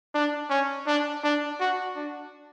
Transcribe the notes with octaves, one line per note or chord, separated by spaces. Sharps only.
D4
C#4
D4
D4
F#4
D4